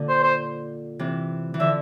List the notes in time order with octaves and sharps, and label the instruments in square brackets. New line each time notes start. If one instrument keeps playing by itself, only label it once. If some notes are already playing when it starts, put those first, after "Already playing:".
Already playing: [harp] A#2 D3
[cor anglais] C5
C5
[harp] C3 E3
E3
[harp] D3 F3 [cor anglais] E5